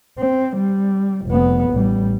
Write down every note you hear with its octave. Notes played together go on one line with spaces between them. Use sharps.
C4
G3
F1 B3
A1 G3